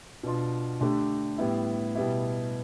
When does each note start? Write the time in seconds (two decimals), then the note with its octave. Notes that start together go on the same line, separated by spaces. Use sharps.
0.23 B2 B3 D4 F4
0.81 D3 A3 D4 G4
1.38 A2 G3 B3 E4
1.95 B2 G3 B3 E4